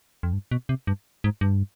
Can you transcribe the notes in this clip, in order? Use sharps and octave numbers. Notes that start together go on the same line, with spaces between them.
F2
G2
B2
C3
G2
G#2
G2